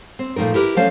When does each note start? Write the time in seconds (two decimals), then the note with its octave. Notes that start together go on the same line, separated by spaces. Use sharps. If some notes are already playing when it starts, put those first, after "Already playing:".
0.19 C4
0.36 A#2 F3 A3 D#4 A#4
0.54 E4 G4 A#4 B4
0.76 F3 F#3 A3 C#4 C5 F5